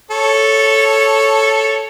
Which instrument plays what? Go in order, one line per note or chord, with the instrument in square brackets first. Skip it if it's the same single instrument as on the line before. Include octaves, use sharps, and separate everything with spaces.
[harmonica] A4 C#5